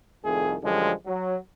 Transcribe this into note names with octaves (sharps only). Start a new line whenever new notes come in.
C2 F2 D#3 A3 G#4
F#2 D3 F3 G3 G#3
F#3